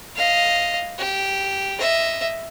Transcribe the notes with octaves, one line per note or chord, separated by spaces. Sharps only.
D#5 F5
G4
D#5 E5